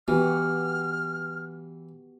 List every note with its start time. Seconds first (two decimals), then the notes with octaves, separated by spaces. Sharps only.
0.08 E3 B3 F#4 G4 F6